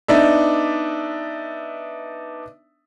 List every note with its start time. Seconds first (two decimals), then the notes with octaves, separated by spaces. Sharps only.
0.08 B3 D4 D#4 D5 E5